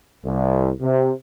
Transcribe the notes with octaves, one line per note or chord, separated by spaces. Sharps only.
C2
C3